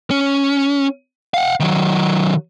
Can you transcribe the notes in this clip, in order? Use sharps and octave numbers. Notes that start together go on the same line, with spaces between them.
C#4
F5 F#5
D#3 F#3